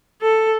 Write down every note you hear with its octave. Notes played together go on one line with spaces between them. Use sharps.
A4